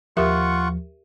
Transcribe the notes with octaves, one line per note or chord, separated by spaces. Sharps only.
D#2 F3 F4 G4 A#4 E5 F#5 C#6